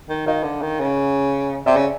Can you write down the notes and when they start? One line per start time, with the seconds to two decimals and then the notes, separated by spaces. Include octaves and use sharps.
0.09 D#3
0.26 D#3 D#5 F5
0.43 D3
0.62 D#3
0.79 C#3
1.66 C3 D5 E5
1.76 C#3